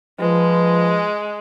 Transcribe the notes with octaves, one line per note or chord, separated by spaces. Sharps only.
F3 G#3 B4